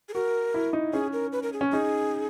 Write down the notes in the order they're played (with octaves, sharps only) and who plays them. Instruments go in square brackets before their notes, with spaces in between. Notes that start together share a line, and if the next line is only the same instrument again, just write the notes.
[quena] G#4
[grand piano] F#4 [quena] A#4
[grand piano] E4
D#4
[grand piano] C#4 [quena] G#4
[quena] A#4
B4
A#4
G#4
[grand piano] C#4
[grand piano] D#4 [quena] G#4